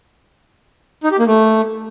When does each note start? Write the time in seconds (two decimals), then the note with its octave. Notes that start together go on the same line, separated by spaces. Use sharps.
1.04 D#4
1.11 G4
1.19 A#3
1.27 A3